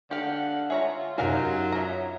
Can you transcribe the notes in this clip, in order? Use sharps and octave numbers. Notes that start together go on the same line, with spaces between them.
D3 G4 F5 F#5
F4 G#4 C#5 E5 A#5
F#2 C3 F#3 D#4 A#4 F5 G#5
D#4 C#5 E5 A#5